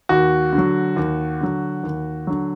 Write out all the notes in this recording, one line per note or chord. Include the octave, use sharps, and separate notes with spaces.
D#2 F#4
D3
F#3
D#2
D3 F#3
D#2
D3 F#3